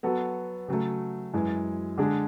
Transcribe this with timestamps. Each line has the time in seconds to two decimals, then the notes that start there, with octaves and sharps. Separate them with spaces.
0.03 F#3 B3 F#4 A4
0.68 C#3 F#3 A3
1.34 F#2 E3 G#3
1.98 D3 G#3 D4 G#4